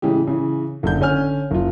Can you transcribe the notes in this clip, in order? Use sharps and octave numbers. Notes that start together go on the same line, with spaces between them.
A2 C#3 E3 G#3 G4
C#3 E3
F#1 D3 G6
D3 C#4 G#5 F6
F#1 F4